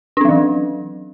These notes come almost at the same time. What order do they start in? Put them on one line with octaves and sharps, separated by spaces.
D4 C4 F#3 E3